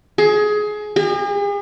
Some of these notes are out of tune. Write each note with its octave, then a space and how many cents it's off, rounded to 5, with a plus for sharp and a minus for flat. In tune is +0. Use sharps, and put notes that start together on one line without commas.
G#4 +20
G#4 -45